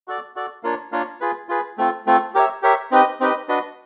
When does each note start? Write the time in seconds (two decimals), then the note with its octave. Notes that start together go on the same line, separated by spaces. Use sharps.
0.08 F#4 A4 D5
0.36 F#4 A4 D5
0.63 A#3 D4 F4 A#4 C#5
0.92 A#3 D4 F4 A#4 C#5
1.21 F4 G#4 B4
1.49 F4 G#4 B4
1.78 A3 C4 F4 A4
2.07 A3 C4 F4 A4
2.35 G4 A#4 C#5 E5
2.62 G4 A#4 C#5 E5
2.91 C4 D#4 G4 B4 D#5
3.20 C4 D#4 G4 B4 D#5
3.48 D4 F#4 B4 D#5